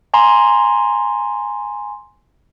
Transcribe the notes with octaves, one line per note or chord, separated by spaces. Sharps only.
G#5 A#5 C6